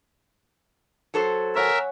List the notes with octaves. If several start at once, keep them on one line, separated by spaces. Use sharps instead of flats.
F#3 A4 C5
A#4 C#5 E5 F#5 G#5